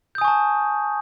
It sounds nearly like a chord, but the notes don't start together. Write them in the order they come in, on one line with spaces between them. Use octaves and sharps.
G6 D#6 G#5 C#6 A5